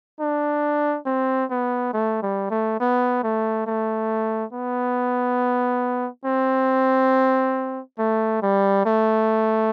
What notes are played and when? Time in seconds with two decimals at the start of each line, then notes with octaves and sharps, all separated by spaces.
0.20 D4
1.06 C4
1.50 B3
1.93 A3
2.23 G3
2.51 A3
2.80 B3
3.23 A3
3.67 A3
4.53 B3
6.25 C4
7.99 A3
8.42 G3
8.86 A3